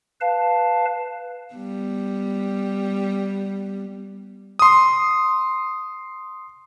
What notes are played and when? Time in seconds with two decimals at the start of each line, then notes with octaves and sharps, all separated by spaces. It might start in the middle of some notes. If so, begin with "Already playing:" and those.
0.21 B4 F5 A5
1.54 G3 B3
4.59 C6 D#6